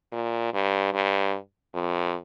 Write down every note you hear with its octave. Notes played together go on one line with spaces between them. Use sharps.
A#2
G2
G2
F2